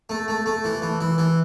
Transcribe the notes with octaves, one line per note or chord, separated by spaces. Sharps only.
A3
A3
A3
E3
E3
E3
E3